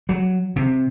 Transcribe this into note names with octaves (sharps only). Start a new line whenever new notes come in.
F#3
C3